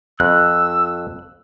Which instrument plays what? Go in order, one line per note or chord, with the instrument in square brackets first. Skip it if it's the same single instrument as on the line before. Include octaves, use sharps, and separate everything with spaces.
[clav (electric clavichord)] F2 [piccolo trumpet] E6 [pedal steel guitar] F#6